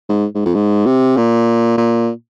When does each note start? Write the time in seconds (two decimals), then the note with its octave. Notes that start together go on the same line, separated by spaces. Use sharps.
0.09 G#2
0.35 G#2
0.45 F2
0.55 G#2
0.86 C3
1.17 A#2
1.77 A#2